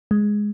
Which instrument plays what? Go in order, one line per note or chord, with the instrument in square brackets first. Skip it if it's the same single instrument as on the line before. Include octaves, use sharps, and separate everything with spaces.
[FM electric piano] G#3